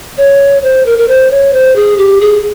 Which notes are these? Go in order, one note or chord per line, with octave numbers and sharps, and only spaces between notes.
C#5
C5
A#4
A#4
C5
C#5
C5
G#4
G4
G#4